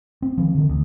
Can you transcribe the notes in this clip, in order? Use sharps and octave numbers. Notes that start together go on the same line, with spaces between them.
C4
D#3 F3
D3 D#3
D2